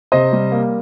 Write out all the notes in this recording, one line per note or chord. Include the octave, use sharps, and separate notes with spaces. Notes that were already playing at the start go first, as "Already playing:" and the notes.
C3 C5 D#5
G3
A#3